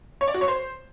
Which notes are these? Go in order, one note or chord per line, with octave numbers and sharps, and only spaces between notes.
C#5
D5
F#4
C#5
C5